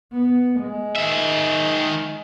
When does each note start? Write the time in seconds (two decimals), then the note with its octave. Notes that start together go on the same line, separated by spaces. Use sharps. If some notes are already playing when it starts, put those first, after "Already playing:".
0.12 B3
0.61 G#3
0.96 D#3 E5